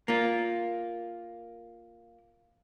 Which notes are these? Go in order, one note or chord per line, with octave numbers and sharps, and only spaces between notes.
A#3 F4